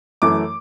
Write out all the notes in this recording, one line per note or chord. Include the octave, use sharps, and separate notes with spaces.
F#2 E3 A3 D6